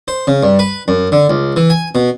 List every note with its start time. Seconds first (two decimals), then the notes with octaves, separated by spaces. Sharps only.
0.08 C5
0.27 C#3
0.43 G2
0.59 B4
0.88 F#2
1.12 D3
1.30 C#2
1.56 E3
1.70 G#5
1.95 B2